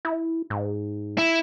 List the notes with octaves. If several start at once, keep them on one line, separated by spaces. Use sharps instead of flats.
E4
G#2
E4